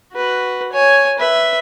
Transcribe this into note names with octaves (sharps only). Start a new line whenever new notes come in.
F#4 B4
C#5 G#5
B4 E5